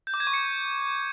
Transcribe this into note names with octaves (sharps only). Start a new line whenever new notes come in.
G6
D6
G#6
C#6
C#7